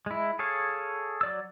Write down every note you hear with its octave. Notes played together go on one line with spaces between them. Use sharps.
G#3 E4
G#4 A4 C#5 F5
F#3 D5 E6